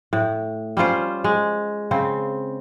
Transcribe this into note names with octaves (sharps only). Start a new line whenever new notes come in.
A2
G3 C#4 F4 C5
G#3
C#3 C4